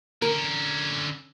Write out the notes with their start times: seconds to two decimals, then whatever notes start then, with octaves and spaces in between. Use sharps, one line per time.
0.22 D3 C#4 A#4